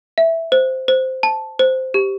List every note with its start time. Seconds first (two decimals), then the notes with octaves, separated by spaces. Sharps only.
0.18 E5
0.52 C5
0.88 C5
1.23 A5
1.59 C5
1.94 G4